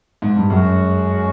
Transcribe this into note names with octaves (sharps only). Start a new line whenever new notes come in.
G#2
G2
F#2 G#3 C#4 F#4